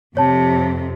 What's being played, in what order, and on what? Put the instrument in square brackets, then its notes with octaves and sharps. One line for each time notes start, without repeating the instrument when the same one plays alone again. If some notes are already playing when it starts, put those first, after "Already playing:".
[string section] F2 [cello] C3 [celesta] C#5 A5